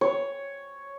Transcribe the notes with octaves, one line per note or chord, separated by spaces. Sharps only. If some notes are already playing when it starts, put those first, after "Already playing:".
C#5